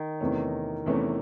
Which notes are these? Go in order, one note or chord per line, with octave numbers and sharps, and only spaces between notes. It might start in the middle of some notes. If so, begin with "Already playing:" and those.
Already playing: D#3
E2 C3 E3 A3 C#4
E2 C3 E3 A3 C#4